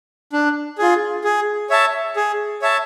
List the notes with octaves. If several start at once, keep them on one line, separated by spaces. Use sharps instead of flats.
D4
F4 G#4
G#4
C#5 E5 A5
G#4
C#5 E5 A5